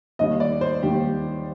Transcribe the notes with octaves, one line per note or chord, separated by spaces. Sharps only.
D#2 D#3 G3 D#5
D5
C5
D#2 D#3 G3 G4